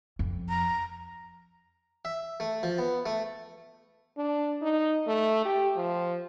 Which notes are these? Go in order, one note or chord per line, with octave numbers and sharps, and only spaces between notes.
F2
A#5
E5
A3
F3
B3
A3
D4
D#4
A3
G4
F3